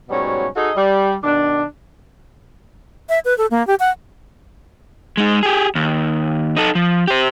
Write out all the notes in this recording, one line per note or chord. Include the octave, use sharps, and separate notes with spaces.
G#2 B2 F#3 G3 C#4
D#4 F#4 G#4 A4 D#5
G3
B2 D#3 D4
E5
B4
A4
A#3
G4
F#5
G#3 D#4
G4 G#4
D#2
D#4 A4
F3
G4 C5